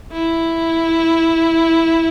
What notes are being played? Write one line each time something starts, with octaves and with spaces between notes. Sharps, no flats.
E4